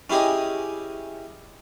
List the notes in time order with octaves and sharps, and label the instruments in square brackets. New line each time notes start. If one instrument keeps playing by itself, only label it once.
[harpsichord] C#4 E4 G4 G#4 D#5